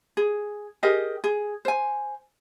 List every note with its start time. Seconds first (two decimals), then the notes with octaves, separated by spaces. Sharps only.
0.17 G#4
0.83 G4 G#4 A#4 D#5
1.24 G#4
1.65 C5 G#5